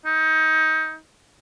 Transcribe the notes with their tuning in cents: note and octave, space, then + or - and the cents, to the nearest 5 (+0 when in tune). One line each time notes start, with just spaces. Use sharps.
D#4 +25